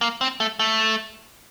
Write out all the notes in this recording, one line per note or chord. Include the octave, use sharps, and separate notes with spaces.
A#3
C4
A3
A3